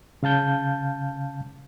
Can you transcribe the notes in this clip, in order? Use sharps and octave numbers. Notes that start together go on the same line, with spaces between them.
C#3 F5 A5 G6